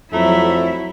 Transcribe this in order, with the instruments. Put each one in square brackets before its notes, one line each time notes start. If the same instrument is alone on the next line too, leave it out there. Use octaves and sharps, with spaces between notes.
[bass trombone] F2 [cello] F#3 E4 [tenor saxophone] A3 [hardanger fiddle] A#5